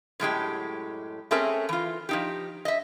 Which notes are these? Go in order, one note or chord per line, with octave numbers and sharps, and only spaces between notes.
F#2 A2 G#3 G4
A3 C4 C#4 G#4 A#4 E5
E3 F4
F3 D#4 G4
D#5 E5